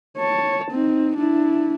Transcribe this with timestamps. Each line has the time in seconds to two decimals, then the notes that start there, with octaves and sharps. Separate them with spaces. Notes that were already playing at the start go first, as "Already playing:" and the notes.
0.18 C#5 A5
0.71 C4 D#4
1.17 D4 E4